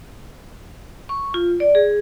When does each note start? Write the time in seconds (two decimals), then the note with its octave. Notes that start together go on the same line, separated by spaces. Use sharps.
1.09 C#6
1.34 F4
1.60 D5
1.75 G#4